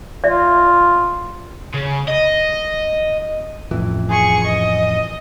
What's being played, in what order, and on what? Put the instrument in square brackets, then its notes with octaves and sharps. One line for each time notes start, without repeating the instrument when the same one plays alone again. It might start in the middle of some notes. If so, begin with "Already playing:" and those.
[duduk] F4 [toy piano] D5 E5
[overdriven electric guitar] C#3
D#5
[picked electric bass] A1 F2 E3
[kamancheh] G#4 C#6
D#5